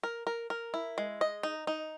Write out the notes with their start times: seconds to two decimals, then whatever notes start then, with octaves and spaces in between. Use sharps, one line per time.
0.03 A#4
0.27 A#4
0.50 A#4
0.74 E4
0.98 G#3
1.21 D#5
1.43 D#4
1.67 D#4